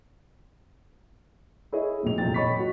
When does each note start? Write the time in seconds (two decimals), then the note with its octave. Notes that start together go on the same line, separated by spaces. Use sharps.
1.72 E4 G#4 C#5 D#5
2.03 E1 A2 F#3 F7
2.18 D#1 F2 C3 F#3 G5 A6
2.34 C#5 D#5 B5 C#6 B6
2.59 F#4